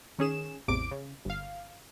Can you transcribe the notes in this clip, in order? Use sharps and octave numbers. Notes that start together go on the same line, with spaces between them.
D#3 C#4 G#4 E7
A1 E2 C3 D6 D7
C#3
G1 F5